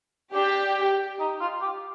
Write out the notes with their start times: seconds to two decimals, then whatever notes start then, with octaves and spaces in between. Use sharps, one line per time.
0.34 D4 G4
1.20 D#4
1.40 F4
1.61 G4